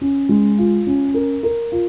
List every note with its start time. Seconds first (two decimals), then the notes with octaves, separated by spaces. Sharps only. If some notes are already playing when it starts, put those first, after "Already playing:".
0.01 C#4
0.29 G#3
0.58 F4
0.87 C#4
1.14 A#4
1.43 A#4
1.72 F4